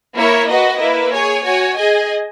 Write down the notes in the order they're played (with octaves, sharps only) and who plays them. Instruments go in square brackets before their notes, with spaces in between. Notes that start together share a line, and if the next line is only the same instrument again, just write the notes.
[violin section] A#3 E4 A#4 C#5
F#4 B4 D#5
A#3 E4 B4
G#4 C#5 G#5
F#4 C#5 G#5
G#4 D#5 G#5